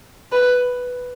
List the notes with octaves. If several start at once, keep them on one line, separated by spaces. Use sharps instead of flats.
B4